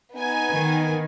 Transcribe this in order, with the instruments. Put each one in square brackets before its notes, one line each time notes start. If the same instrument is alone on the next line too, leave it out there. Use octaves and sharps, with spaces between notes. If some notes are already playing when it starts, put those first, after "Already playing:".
[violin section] B3 D#4 G#5
[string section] D#3